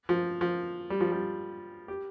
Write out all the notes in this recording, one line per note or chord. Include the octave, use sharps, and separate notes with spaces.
F3
F3
G3
F3
G3
G4